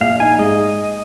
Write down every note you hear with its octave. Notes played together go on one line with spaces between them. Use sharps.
A#1 F5
D#4 G#5
G#2 D#5